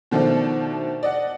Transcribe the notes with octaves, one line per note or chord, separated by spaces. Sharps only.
B2 D#3 F3 A3 D4
D5 D#5 F#5